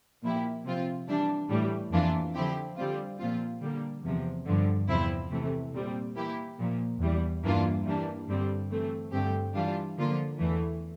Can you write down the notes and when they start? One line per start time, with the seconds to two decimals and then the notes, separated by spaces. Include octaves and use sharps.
0.22 A#2 F3 A#3 E4 G4
0.65 C3 F3 C4 F4
1.07 E3 G3 D4
1.49 A2 E3 G3
1.91 F2 E3 A#3 D4 F4
2.34 D3 F3 C4 E4 G4
2.76 D3 G3 C4 F4
3.18 A#2 F3 C4 F4
3.61 D3 G3 A#3
4.03 E2 C3 F3
4.46 G2 D3 F3
4.88 E2 C3 F3 C4 E4
5.31 C3 E3 A3
5.73 A#2 G3 C4
6.16 E3 A#3 E4 G4
6.58 A#2 F3 A#3
7.00 E2 E3 G3
7.43 G2 E3 A#3 D4 F4
7.85 E3 G3 A#3 D4
8.27 G2 D3 G3 C4
8.70 E3 A3 C4
9.12 G2 D3 A3 C4 G4
9.54 E3 G3 D4 F4
9.97 D3 F3 A#3 F4
10.39 E2 E3 A3